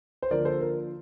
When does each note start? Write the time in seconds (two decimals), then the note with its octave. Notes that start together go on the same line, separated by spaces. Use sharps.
0.22 C5
0.31 D3 F3 A#3 A#4 D5
0.45 A4 C5
0.61 A#4